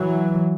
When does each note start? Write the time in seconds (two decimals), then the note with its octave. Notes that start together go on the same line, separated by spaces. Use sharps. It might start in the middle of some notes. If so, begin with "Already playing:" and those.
Already playing: E3 F#3